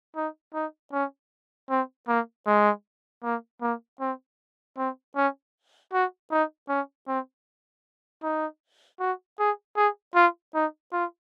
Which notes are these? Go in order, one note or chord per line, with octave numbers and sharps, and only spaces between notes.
D#4
D#4
C#4
C4
A#3
G#3
A#3
A#3
C4
C4
C#4
F#4
D#4
C#4
C4
D#4
F#4
G#4
G#4
F4
D#4
F4